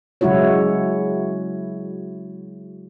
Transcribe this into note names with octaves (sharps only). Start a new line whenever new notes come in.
C#3 F#3 G#3 E4 F#4 C#5